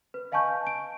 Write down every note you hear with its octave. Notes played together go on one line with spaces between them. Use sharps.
B4
D#5 F5 G#5 A5 C#6 G6
D7